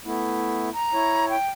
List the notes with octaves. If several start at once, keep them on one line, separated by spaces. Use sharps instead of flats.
A3 B3 E4
A#5
E4 C#5
G5